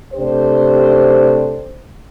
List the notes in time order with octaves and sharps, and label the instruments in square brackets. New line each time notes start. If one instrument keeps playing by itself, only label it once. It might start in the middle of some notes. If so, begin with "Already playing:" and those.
[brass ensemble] C3 A3 D4 G4 C5